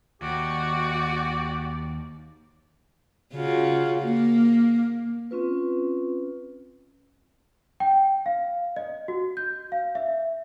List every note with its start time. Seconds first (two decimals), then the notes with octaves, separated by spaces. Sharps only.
0.22 D#2 F#4 G4 D5
3.34 C#3 F4 F#4
4.01 A#3
5.31 C4 C#4 F4 B4
7.80 G5
8.26 F5
8.77 D#5
9.08 F#4
9.37 G6
9.72 F5
9.95 E5